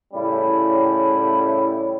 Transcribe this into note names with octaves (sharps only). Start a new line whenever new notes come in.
A2 C#3 G3 C#4 E4